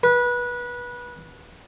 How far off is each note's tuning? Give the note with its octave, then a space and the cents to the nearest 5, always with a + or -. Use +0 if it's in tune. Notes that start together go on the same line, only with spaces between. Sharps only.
B4 -20